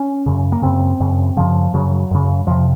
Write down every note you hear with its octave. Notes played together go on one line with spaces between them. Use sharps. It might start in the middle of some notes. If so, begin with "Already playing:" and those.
Already playing: C#4
F#2 C#3
A#3
F#2 C#3 C4
F#2 C#3
F#2 C#3 F3
F#2 C#3 F#3
F#2 C#3
F2 C3 F3